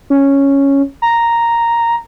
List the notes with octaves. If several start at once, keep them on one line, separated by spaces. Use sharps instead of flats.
C#4
A#5